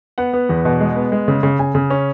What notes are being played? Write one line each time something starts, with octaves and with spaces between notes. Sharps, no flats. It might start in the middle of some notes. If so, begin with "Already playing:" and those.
B3 F#5
B3
E2
B2
G#3
B3
G#3
C#3
C#3
C#3 G#5
C#3
C#4